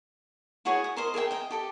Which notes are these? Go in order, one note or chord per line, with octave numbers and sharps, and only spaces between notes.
E4 F#4 G#4 C#5
D#6
A#4 C5 D#5
G#4 A#4 E5 G5
D#5 G5
G4 A4 G5